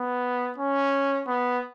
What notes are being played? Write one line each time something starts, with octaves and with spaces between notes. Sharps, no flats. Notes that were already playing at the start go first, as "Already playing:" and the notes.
Already playing: B3
C#4
B3